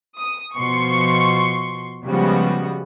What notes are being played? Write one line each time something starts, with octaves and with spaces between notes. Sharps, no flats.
D#6
B2 F3 C6 C#6 C#7
C#3 F3 G3 G#3 B3 F#4